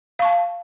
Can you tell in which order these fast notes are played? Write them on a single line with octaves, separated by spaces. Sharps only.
F5 C#6 A5